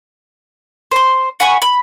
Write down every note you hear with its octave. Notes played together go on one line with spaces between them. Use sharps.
C5 C6
F#5 G#5 B5 C#6
B5